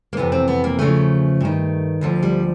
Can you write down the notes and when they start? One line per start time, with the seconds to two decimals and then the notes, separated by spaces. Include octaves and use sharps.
0.13 A#3
0.17 F2 C3 E3 B3
0.32 C4
0.48 B3
0.64 A#3
0.79 E2 C#3 F3 A3
1.41 G2 D#3
2.01 D2 D3 F3
2.23 G3